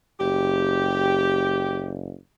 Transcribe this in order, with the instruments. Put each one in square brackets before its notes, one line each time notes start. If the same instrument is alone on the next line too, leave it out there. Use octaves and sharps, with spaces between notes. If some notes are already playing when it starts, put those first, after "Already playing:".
[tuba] F#1 [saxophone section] G4